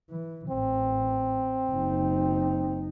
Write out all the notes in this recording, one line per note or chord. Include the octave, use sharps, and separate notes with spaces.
E3
A1 C4
F#1 D#4